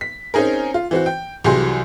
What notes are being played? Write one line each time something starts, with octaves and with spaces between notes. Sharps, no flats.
B6
C4 C#4 D#4 G#4 A#4
F4
E3 C4 F#4
G5
C2 E3 F#3 G4 G#4 C6